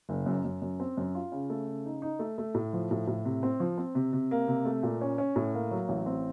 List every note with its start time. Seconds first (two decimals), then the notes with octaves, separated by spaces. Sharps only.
0.09 F#1
0.26 F#2
0.45 F#2
0.62 F#2
0.80 C4
0.97 F#2
1.15 F4
1.32 C#3
1.50 A3
1.67 C#3
1.85 D#4
2.02 D#4
2.19 A3
2.38 A3
2.55 A2
2.73 F3
2.91 A2
3.07 A2
3.25 C3
3.43 C4
3.60 F3
3.78 C4
3.95 C3
4.13 C3
4.31 A#3
4.48 C3
4.65 A3
4.83 A#2
5.01 C#4
5.18 C#4
5.36 A2
5.54 A#3
5.71 F#3
5.89 A1
6.06 C4